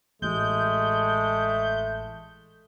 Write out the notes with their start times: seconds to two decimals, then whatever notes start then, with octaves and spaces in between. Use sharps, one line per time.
0.22 A1 G#3 A3 G6